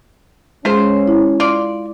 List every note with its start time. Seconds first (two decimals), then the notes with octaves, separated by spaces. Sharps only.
0.65 G#3 C#4 F4 G#4 C5
1.08 E4
1.40 F4 D5